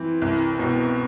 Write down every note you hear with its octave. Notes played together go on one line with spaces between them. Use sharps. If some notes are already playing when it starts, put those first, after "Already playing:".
Already playing: E3 C4
C2
B2